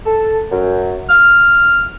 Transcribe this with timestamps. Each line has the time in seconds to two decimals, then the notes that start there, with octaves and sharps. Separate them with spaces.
0.06 A4
0.51 F#2
1.09 F6